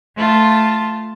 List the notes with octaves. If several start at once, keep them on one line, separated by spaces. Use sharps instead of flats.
A3 F4 A5